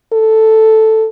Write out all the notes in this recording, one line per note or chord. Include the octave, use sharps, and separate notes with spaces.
A4